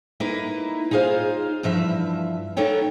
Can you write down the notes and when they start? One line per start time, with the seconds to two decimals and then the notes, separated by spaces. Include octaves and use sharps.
0.20 A#3 D#4 E4 B4
0.91 D#4 F4 G#4 C5 F5
1.63 G2 E3 F3 E5
2.57 A#3 B3 D#4 A4 C#5 G5